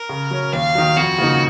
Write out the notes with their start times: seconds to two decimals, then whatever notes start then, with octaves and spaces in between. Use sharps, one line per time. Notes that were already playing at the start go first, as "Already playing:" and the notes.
Already playing: A#4
0.09 C#3
0.31 F#3 C#4
0.53 D#2 F5
0.75 D#3 F#3
0.96 F2 F#4
1.18 C#3 F3 A#3 D#4